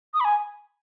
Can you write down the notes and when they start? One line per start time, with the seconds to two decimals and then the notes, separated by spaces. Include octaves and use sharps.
0.14 D#6
0.20 B5
0.25 G#5